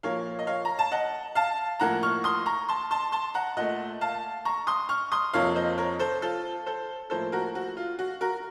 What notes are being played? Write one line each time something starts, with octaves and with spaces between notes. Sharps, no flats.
A#2 F3 A#3 C#5 F5
D#5
C#5 F5
A#5
A5
D#5 F#5
F5 A5
A2 F3 A#3 F#5 A#5
C#6 F6
C6 D#6
A#5 C#6
A5 C6
A5 C6
A5 C6
F#5 A#5
A#2 A3 D#5 F#5
F5 A5
A#5 C#6
C6 D#6
C#6 F6
C6 D#6
F2 C3 F3 A#3 C#5 F5
C5 D#5
A#4 C#5
A4 C5
F4 A4
A4 C5
A2 F3 A#3 A4 C5
F#4 A#4
F#4
F4
F#4
F#4 A#4